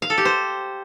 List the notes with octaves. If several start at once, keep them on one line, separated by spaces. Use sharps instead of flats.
F5
A4
G4
C5